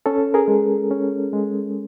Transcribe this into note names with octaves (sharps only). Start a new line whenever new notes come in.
C#4 A4
G#4 A#4
G#3
C#4
G#3